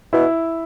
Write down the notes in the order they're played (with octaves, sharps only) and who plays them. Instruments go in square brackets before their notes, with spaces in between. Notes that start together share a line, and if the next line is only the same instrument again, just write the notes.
[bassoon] B2 [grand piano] E4